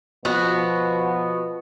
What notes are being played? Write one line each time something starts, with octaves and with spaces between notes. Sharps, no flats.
B2 F3 B3 F#4